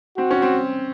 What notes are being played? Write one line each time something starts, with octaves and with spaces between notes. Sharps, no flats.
C4 F#4
C#4
C4